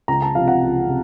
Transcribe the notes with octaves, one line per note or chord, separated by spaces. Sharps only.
C#2 A#5
A5
C3 F3 F5
F#5
C#2
C3